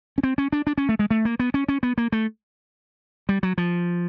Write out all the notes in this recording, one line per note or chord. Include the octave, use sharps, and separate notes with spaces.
C#4
C4
C#4
D4
D4
C#4
A3
G#3
A3
A#3
B3
C#4
C#4
B3
A#3
A3
G3
F#3
F3